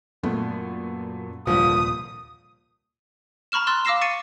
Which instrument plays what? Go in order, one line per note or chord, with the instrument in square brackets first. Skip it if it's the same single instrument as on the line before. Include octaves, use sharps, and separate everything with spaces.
[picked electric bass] F#2 [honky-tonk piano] A#2 A3 B3
[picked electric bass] D#1 C2 A#2 [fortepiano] G2 D3 F3 [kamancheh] D#6
[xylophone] A#5 B5 C#6 F6 E7
C6 E6 F#6 A6
F5 D6 E6 A#6 C7 E7
C#6 A6 C7 C#7 D#7